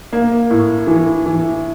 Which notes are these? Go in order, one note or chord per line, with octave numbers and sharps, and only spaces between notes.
A#3
A2
E3
E3